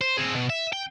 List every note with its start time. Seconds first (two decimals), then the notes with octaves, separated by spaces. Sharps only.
0.01 C5
0.17 C4 G#4
0.34 B2
0.50 E5
0.73 G5